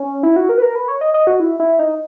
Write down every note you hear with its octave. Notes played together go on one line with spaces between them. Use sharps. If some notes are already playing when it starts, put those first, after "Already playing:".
Already playing: C#4
E4
F#4
A#4
B4
A#4
B4
C#5
D#5
D#5
F#4
E4
E4
D#4